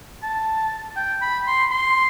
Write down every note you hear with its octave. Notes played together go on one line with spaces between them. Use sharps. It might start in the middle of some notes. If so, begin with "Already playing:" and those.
A5
G5
B5
C6
C6